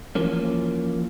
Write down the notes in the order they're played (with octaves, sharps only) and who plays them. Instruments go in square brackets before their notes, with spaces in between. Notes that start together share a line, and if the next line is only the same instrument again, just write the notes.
[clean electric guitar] E3 F3 A#3 C#4